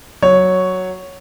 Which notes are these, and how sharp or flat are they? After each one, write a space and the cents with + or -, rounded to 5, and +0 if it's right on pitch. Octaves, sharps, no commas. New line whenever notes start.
F#3 +0 C#5 +0